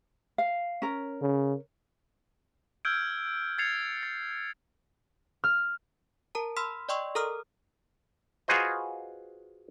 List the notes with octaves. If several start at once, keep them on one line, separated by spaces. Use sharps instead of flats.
F5
C#4 A#4
C#3
E6 F6 G6 G#6 D7
G#6 A6 C7 C#7 F7
A6
F6
A#4 A5 A#5
B5 C6 E6 F6 B6
D5 D#5 G5 C6 C#6 E6
A4 A#4 A#5 D#6 F6
F4 F#4 G#4 B4 C5 D#5